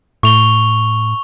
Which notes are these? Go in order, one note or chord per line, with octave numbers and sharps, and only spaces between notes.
A2 C#6 F7 G7